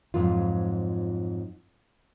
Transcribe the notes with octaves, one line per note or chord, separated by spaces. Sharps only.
F2 G#2 F#3 F4